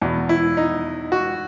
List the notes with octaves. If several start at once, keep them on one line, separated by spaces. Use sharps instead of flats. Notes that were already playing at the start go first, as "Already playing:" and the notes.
E2 B2
E4
D#4
F#4